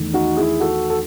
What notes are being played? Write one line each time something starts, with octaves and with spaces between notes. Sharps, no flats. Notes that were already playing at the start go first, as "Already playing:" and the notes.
Already playing: E2 D#3 A3
D#4 F#4
E4 G#4
F#4 A4
A4